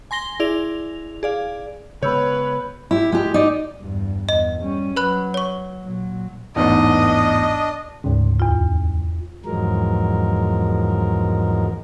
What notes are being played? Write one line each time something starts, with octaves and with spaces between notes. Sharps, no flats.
G#5 C6 A#6 G7
E4 G#4 D5 F7
G#4 D5 F5
C#3 G#3 B3 B4 C#5 B5 E6 G6
E4 G4
G#3 G4
D#4 D5
E2 G2
E2 D#5
G3 C#4
F#3 B4 B5 F#6
C#5 C#6
A#2 F#3
A1 E2 G#2 D4 D#5
D2 G#2 C#3
E2 F4
E2 G#2 F3 F#3 G#3 A#4